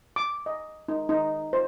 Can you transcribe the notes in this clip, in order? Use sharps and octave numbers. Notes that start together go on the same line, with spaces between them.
D6
D#5
D#4
D#4
C5